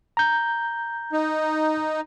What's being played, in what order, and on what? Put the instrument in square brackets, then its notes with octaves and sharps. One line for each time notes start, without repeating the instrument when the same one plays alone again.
[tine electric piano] A#5 G6
[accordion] D#4